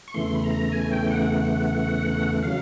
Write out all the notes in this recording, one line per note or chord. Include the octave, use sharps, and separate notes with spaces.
C#6
E2 C#3 E3 A3 C6
B5
A#5
G#5
G5
F#5
C#3 F#3 F5